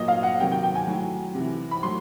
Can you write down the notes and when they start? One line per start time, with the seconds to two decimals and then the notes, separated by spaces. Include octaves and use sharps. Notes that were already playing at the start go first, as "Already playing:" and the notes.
Already playing: A#2 F#3 D#5
0.08 F5
0.23 F#5
0.40 C3 D#3 F#3 G5
0.51 G5
0.63 G5
0.75 G#5
0.88 A2 F#3
1.35 C3 E3
1.71 B5
1.83 A2 F#3 C6